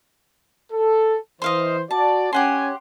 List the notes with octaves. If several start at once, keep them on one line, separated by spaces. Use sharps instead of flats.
A4
E3 C5 D#5 F5 C6
F#4 D5 A5
C#4 G4 F#5 G#5 C6